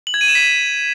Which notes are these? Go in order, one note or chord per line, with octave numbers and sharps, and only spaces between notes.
F#7
G#6
D#7
E7
B6